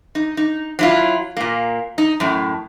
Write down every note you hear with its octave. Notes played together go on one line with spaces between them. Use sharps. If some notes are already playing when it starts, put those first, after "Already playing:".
D#4
D#4
F#3 E4 F4
A#2 A#3
D#4
F#2 A2